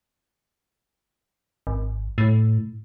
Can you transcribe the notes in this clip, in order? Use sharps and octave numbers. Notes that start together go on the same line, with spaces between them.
G#1
A2